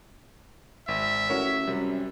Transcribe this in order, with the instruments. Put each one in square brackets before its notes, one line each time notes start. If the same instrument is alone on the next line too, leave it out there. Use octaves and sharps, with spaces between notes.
[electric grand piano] G#1 [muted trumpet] E5
[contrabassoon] A1 [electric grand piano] F#4 A#4 C#5
[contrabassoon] F#2 [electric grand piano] C3 G3